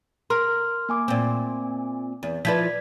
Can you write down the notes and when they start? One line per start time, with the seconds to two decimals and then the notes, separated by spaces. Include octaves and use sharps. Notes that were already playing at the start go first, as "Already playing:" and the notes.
0.30 A#4 C6 F6
0.89 A#3 G#5 D6
1.08 A#2 C4
2.23 E2
2.45 F3 E4 B4 D5 G#6 B6